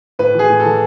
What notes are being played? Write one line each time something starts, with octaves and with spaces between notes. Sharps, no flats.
A2 B4
E3 G#4
A2
A4
E3